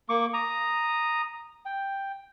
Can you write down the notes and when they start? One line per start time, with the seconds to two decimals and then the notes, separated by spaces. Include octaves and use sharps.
0.09 A#3 C#6 D6
0.34 A#5 D#6
1.66 G5